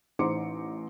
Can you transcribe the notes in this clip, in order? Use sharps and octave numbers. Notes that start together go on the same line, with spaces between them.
A1 D#4 C5 C6 D6 C#7